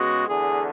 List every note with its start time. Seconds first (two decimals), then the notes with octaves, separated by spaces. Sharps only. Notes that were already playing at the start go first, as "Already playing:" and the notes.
Already playing: C#3 G#3 B3 F#4
0.27 E2 D3 A3 G#4